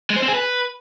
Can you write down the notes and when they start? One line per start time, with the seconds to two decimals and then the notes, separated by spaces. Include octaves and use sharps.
0.10 G#3
0.16 C5
0.22 C4
0.28 G#4
0.34 B4